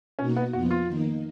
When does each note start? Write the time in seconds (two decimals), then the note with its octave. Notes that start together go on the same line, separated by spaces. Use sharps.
0.19 B2 A#3 C#4 D#4 F#4
0.37 B3
0.53 F2 F3 B3 F4 F#4
0.71 F4
0.88 D#3 A#3 D#4